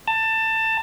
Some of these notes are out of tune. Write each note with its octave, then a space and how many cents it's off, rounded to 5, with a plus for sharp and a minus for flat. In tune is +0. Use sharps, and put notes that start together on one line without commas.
A5 +20